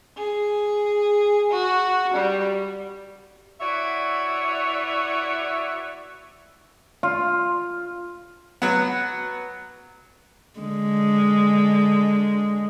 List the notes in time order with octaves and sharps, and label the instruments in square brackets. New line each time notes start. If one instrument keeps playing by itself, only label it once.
[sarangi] G#4
F#4
G3
[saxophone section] E4 F#4 B4 C#5 D5 E5
[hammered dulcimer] F4
[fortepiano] F#3 B3
[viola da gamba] D3 G#3